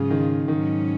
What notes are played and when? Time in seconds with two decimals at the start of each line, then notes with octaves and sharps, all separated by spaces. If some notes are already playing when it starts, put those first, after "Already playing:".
Already playing: G#2 C#3 F#3 C#4 F4 G#4
0.10 D#3
0.48 G#2 D#3 F#3 C#4